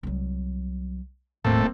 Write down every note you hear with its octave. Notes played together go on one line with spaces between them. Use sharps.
C2 F#3
D#1 A2 A3 A#3 C4